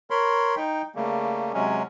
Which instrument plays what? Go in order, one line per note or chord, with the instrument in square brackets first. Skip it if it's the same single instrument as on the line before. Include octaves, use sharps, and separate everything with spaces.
[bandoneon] A#4 C#5 B5 C6
D#4 G5
C#3 G3 A3 A#3
C3 F#3 G#3 C#4